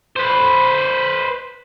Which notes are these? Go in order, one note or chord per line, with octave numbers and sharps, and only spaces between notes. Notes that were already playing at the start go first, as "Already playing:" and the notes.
B4 C5